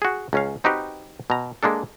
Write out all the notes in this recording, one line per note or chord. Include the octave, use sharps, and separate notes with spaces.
F#4 G#4
C#2 C#4 F5
C4 D#4 F#4 G4 B4
B2 A#5
G#3 A#3 D4 A4